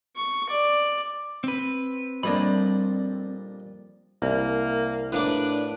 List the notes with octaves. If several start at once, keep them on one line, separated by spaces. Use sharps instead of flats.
C#6
D5
C4 B4
F2 A#2 G3 C4 D4 C#5 D#5 B5
C2 A#3
A2 A#3 D4 B4 D6